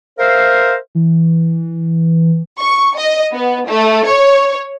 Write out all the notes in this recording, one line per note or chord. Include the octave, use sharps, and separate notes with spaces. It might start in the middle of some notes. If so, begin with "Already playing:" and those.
A#4 C5 E5 F5
E3
C#6
D#5
B3
A3
C#5